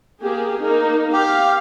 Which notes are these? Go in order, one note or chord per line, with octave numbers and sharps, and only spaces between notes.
A#3 G4 G#4
A#3 D#4
G4 F5